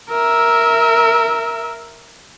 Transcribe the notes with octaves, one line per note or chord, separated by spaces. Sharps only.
A#4 E5